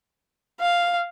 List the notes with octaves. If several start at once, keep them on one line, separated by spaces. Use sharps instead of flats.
F5